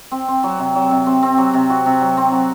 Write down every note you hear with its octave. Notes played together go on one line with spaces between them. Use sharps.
C4
C4
F#3
C3
F#3
C3
C4
C4
F#3
C3
F#4
C3
F#3
C4
F#3